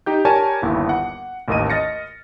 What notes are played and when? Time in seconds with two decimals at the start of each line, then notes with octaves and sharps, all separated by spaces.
0.06 D#4 G4 G6
0.25 G4 A#4 C#5 D5 G#5 A5
0.62 G1 D#2 E4
0.89 F#5
1.48 A1 D#2 A#3 D#5 D#7
1.70 D#5 F6 A6 A#6 C#7